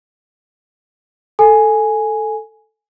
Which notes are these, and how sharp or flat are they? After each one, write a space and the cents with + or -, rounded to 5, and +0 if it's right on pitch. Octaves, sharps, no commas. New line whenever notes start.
A4 +0 G#5 +0